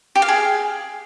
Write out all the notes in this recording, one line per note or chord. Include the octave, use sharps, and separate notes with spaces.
G4
F5
G#4